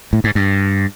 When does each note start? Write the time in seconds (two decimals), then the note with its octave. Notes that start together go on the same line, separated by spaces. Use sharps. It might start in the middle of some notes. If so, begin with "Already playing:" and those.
0.13 A2
0.24 G#2
0.35 G2